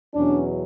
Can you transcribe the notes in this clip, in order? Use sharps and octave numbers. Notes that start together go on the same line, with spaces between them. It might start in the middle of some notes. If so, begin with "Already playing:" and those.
E2 B2 F#3 C#4 D4